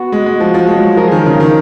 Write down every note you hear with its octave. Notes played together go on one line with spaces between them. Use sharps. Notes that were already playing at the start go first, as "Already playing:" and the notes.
Already playing: B3 F#4
G#3
G#3
F3
F3
G#3
F#3
F3 A#4
D#3 G#4
A#4
C#3
D#3